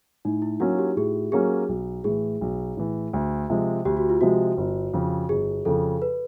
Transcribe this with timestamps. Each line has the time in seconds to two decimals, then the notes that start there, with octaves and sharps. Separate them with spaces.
0.25 A2 D#4
0.42 E4
0.60 F#3 A#3 C#4 F#4
0.79 G4
0.97 A2 G#4
1.32 F#3 A#3 C#4 G#4
1.69 B1
2.04 A2 E3 G#4
2.41 B1
2.77 A2 E3
3.14 D2
3.50 C3 F3 G#3
3.85 D2 G4
3.97 F#4
4.09 F4
4.21 C3 F3 G#3 F#4
4.57 G1
4.94 F2 C#3
5.29 G1 G#4
5.65 F2 C#3 A4
6.02 B4